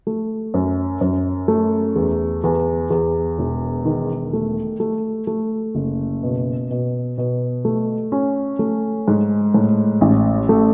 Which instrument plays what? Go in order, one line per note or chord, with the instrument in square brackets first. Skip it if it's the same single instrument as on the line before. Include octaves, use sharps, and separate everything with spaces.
[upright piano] A3
F#2
F#2
A3
E2
E2
E2
E1
D#3
A3
A3
A3
F#1
B2
B2
B2
A3
C#4
A3
G#2
A2
A1
A3